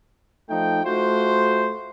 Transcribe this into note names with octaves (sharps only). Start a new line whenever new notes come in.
F3 A3 D#4 G5
A3 F4 F#4 C5